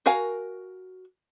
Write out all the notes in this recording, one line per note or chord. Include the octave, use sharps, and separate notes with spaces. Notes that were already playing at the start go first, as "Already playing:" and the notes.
F#4 A#4 F5 G#5